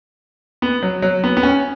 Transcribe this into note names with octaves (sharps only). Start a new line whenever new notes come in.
B3
F#3
F#3
B3
B3
C#4